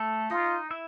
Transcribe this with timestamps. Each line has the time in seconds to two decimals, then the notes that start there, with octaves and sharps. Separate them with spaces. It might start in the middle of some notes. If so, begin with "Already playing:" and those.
Already playing: A3 A4
0.31 D#4 F4 D#5
0.71 E4 E5